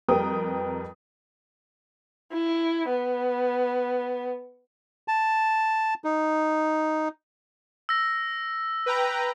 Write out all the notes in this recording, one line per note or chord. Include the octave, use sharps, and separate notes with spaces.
F2 G3 A#4 B4 G5 D#6
E4
B3
A5
D#4
E6 A#6
B4 G5 A#5